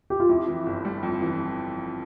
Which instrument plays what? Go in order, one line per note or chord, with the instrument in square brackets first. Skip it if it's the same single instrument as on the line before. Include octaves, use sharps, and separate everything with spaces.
[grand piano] G4
F4
[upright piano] F2 [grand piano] E4
[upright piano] E3
G1
G3
F2
E3